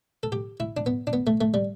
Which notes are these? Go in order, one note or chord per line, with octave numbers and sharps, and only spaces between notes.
A4
G4
E4
D4
B3
D4
B3
A3
A3
G3